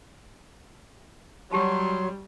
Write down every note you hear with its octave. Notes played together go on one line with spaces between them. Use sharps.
F#3 G3 G4 A5 B5 C6